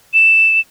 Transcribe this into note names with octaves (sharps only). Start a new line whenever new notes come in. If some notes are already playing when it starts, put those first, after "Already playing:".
E7